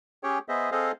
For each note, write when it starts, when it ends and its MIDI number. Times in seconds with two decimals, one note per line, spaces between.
0.23 0.39 61
0.23 0.39 67
0.23 0.39 68
0.23 0.39 73
0.23 0.39 79
0.49 0.70 59
0.49 0.70 68
0.49 0.70 72
0.49 0.70 75
0.49 0.70 76
0.72 0.92 60
0.72 0.92 68
0.72 0.92 69
0.72 0.92 72
0.72 0.92 75
0.72 0.92 77